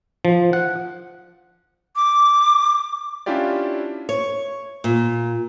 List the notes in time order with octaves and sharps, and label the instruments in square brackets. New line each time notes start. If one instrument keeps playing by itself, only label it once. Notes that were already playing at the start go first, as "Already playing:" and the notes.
[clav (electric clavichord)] F3
F#5
[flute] D6
[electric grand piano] C#4 D4 E4 F4 G4 D5
[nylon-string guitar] C#5
A#2